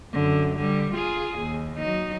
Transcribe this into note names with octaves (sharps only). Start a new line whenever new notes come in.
F#2 D3
D3 G3
F4 G#4
D#2
F#3 D#4